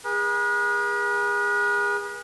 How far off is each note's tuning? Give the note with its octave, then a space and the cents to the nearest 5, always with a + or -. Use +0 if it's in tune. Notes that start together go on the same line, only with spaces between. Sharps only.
G#4 -25 B4 -40